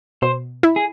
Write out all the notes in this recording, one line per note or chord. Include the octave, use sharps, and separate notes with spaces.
B2 C5
E4
G#4